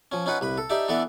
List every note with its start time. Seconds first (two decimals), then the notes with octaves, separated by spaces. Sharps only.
0.12 F3 C#4
0.26 C#4 D#4 F4 B4 F#5
0.41 C2 B4 B5
0.58 A4
0.70 D#4 G4 D5 E5 G5 A5
0.88 E3 B3 D4 A4 D5 E5